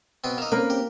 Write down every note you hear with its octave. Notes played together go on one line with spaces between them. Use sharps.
B2 B3 C4
A#3 D#4 E6 F6
A#3 C4 C#4 A#4 B4
G4